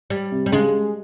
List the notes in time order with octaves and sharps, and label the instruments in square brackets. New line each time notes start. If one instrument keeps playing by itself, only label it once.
[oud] G3
[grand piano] C3
[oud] G3
[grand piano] C#3 [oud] G#3